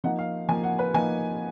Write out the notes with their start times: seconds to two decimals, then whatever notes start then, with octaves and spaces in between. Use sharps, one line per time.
0.04 F3 A#3 D#4 F#5
0.19 F5
0.49 F3 A#3 D#4 G#5
0.64 F#5
0.79 B4
0.94 F3 A#3 D#4 G#5